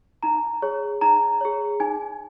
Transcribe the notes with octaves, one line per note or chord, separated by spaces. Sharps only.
D#4 A#5
G#4 C#5
D#4 A#5
G#4 C#5
D#4 G#5